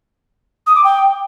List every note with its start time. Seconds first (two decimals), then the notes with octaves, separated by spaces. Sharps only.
0.67 D#6
0.75 D6
0.84 G5